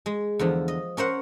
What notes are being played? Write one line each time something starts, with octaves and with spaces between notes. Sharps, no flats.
G#3
E2 D3 F3
D#5
C#4 A#4 C5 F#5